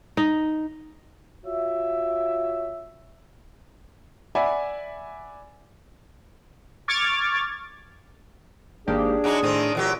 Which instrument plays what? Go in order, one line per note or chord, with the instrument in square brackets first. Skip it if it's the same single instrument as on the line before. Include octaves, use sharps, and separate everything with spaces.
[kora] D#4
[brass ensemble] F4 F#4 C#5 E5
[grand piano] D5 E5 F#5 G#5 B5
[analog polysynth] C#6 D6 F6 G#6 A6
[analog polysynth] G#1 A#3 G4 [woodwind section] D4 G#4
[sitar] F#3 G#3 D#4 [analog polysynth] D6
[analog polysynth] A2 D#7 [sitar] D#3 C4
[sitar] E2 F#3 G4 [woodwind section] A#2 [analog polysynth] D#5 D7